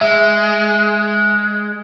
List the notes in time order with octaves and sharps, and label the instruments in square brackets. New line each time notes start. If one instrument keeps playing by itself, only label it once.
[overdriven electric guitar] G#3 [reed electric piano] E5